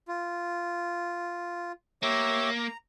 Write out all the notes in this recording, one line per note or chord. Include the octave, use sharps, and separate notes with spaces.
F4
A#3 G4 C#5 E5
A#5